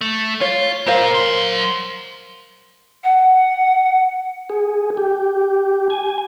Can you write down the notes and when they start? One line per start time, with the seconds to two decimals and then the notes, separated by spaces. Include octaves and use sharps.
0.01 A3
0.41 F4 C#5
0.87 A#2 A#4 C5 F5
1.14 F#3 C6
3.04 F#5
4.50 G#4
4.97 G4
5.90 G#5